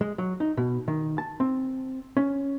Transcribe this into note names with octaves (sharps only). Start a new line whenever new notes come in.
G#3
F#3
D#4
B2
D#3
A5
C4
C#4